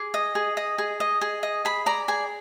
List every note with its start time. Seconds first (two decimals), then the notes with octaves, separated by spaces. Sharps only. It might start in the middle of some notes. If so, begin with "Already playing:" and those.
Already playing: G#4 D6
0.14 D#5
0.35 G#4
0.57 D#5
0.78 G#4
1.00 D#5
1.21 G#4
1.43 D#5
1.65 G#4 B5
1.86 D5 A#5
2.08 G#4 G#5